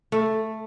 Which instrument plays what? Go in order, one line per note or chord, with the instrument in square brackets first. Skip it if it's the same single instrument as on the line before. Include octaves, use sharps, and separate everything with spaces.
[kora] A3